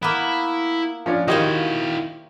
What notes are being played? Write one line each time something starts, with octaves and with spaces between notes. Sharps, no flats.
A#3 B3 E4
F3 C#4 D4
D#3 E4 F#4 G4 C5 C#5 D#5 F5